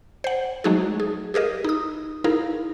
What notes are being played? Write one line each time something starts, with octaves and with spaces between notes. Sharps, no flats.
C5 F#5
F#3 G#3 A3 D#4 F#4 G#4
G#4
G4 G#4 A#4 D#5
D#4 D#6
D#4 E4 G#4 A#4 F5